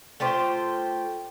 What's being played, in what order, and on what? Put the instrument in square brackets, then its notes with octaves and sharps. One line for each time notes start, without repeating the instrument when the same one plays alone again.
[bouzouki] A3 F4 G4 C5